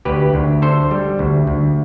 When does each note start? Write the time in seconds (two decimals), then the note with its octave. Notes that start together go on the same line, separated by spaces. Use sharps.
0.05 D2 G4 B4
0.34 D2
0.62 D3 A4 C5
0.91 G3
1.19 D2
1.47 D2